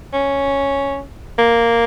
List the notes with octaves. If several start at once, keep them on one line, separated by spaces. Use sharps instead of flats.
C#4
A#3